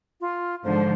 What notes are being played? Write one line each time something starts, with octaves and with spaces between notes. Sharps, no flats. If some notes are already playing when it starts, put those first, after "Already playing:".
F4
G#2 D3 F3 C5